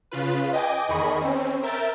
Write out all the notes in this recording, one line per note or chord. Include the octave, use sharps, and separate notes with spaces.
C#3 F4 B4
D#5 G5 G#5 D6
E2 D#3 G#4 D#5 B5 C#6
C4 C#4
A#4 E5 G6 A6 D7